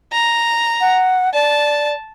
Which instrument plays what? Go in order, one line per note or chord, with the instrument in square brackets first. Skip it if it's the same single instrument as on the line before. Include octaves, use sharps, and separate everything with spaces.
[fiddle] A#5
[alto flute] F#5
[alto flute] D5 [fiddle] A5